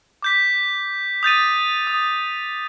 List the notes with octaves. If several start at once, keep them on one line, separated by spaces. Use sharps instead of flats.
D6 G6 B6
D#6 G6 A6 D#7
D#6